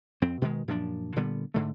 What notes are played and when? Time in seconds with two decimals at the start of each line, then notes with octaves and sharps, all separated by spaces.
0.22 F2 C4
0.42 B2 D#3 F#3 G#3
0.68 F#2 A#2 F3 D4
1.16 A#2 D3 G3 B3
1.54 G#2 D3 A3